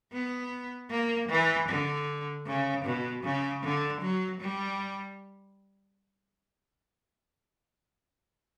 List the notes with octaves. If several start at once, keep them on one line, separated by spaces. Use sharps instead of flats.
B3
A#3
E3
D3
C#3
B2
C#3
D3
F#3
G3